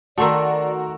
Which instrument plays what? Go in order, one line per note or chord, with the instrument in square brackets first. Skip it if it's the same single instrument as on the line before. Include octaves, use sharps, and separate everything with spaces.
[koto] D#3 A3 [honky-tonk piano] F#4 A#4 [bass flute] D5 [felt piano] A5 C6 E6